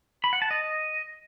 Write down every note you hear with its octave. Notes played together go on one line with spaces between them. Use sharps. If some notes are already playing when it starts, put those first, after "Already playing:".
B5
F#5
A5
D#5